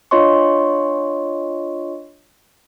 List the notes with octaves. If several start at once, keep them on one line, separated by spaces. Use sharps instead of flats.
D4 F4 C#5 D#5 C6 C#6